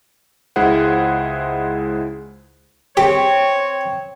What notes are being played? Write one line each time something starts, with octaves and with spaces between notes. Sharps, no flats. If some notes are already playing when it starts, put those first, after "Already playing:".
C#2 G#3 E4 G#4 C5 F#5
C4 G4 C#5